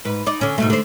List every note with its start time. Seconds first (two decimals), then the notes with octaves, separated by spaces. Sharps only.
0.05 G#2 B4
0.26 D#4 D5
0.41 D3 C#4
0.58 G#2 B2 A3
0.70 D3 C5